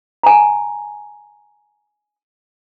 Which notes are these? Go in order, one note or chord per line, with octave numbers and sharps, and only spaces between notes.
G#5 A#5